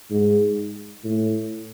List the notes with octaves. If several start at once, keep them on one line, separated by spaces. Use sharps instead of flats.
G#2
A2